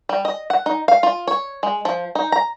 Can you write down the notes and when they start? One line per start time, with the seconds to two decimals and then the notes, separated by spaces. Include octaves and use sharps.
0.09 G3
0.25 D#5
0.50 F#5
0.66 D#4
0.88 F5
1.03 F4
1.27 C#5
1.63 G#3
1.85 F3
2.15 D#4
2.32 A#5